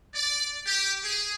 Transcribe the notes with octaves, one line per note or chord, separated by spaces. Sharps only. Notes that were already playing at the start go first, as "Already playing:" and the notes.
D5
G4
G#4